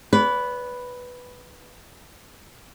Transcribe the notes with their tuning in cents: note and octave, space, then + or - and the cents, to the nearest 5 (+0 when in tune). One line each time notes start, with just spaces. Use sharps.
B4 +0 D5 -40